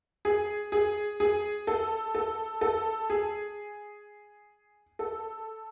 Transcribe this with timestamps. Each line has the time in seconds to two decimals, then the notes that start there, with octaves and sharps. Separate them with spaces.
0.25 G#4
0.72 G#4
1.20 G#4
1.67 A4
2.15 A4
2.61 A4
3.10 G#4
4.99 A4